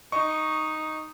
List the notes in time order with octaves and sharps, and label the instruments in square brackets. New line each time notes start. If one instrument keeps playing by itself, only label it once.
[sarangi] D#4 [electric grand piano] D#5 C#6